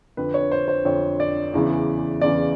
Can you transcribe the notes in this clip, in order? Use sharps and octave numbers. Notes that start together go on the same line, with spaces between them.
F2 D3 B4
C#5
C5
C5
F2 D3 C#5
D5
E2 C#3 E3
E2 C#3 E3 D5